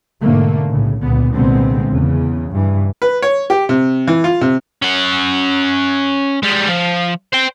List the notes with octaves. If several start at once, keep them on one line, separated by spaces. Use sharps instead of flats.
G#2 B2 D3 A3 A#3
B1 A2 C#3
C#2 A#2 D3 B3
C2 A#2 D3 G#3 B3 C4
E2 C#3
G2 E3
B4
C#5
G4
C3
E3
F4
C3
C#4 F#5
G3 G#3
F3
C5 G5